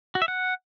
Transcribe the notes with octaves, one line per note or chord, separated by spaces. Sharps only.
F#4
E5
F#5